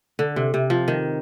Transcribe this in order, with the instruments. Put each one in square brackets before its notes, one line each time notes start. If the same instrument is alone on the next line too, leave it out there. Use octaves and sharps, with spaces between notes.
[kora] D3
C3
C3
F3
D#3